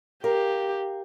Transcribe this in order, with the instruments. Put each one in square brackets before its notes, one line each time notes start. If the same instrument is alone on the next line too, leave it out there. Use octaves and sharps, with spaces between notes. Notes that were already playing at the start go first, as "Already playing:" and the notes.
[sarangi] G4 [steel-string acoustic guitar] A#4 F5